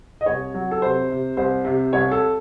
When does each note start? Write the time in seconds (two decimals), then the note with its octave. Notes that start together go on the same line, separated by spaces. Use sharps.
0.21 D#5
0.26 C2 C#5
0.54 F#3
0.71 A4
0.82 C3 C5
1.10 C3
1.37 C2 C5
1.65 C3
1.93 C2 C#5
2.12 A4